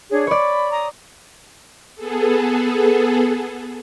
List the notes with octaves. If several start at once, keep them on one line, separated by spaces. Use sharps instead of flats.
D4 G#4 C#5
C#5 D5 B5
A#5 D#6
B3 G#4 A4